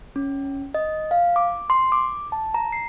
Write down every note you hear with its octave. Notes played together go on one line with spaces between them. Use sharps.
C#4
D#5
F5
D6
C6
D6
A5
A#5
C7